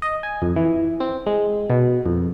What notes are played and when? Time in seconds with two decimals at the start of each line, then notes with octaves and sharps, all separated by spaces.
0.02 D#5
0.23 G#5
0.42 F2
0.56 E3
1.00 C4
1.26 G#3
1.70 B2
2.06 F2